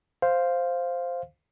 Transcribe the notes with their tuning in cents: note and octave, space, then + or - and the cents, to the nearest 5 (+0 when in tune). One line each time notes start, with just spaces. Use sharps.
C5 +0 F5 +0